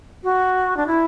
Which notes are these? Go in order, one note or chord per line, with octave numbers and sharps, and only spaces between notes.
F#4
D4
E4